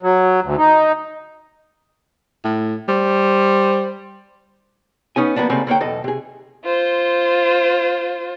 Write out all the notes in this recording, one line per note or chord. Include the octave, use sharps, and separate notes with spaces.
F#3
D2
D#4
A2
G3 C5
B3 C#4 D#4 G#5
F3 G3 A#3 B3 D4
C#3 G3 A3 A#3 C4
D3 A#3 C#5 G5
B1 E2 A4 D#5
C3 G#4
F4 C5